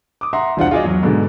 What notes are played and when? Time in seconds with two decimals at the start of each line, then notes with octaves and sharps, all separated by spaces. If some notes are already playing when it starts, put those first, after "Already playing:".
0.21 D6 D#6
0.33 E5 F#5 A#5 C6
0.57 E1 C2 D4 F4 C5 F#5
0.71 F4 F#4 G#4 D5 D#5
0.84 E2 F#3
1.02 G#2 B2 D3 G#3